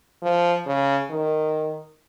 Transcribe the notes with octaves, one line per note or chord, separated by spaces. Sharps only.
F3
C#3
D#3